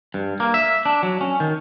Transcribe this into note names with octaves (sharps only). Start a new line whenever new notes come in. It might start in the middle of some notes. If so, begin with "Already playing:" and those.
G2
A#3
E5
D4
F#3
C#4
D#3